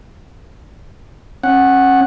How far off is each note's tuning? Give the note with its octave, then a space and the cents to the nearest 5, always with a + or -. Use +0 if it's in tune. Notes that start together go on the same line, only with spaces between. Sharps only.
C#4 -30 F#5 +0